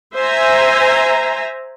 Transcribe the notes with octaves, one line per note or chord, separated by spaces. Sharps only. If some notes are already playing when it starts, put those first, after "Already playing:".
C5 E5 G#5 A#5